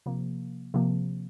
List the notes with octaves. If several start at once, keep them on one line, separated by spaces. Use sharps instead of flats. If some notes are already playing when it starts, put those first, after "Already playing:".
C3 F3 A#3
C3 F3 A#3